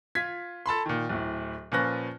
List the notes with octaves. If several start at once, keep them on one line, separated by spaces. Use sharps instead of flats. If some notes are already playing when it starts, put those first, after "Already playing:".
F4 G#6 B6
A4 A5 B5 C6
A#2 D#3
D1 A2
A#2 F3 C#4 B4 F#6 A#6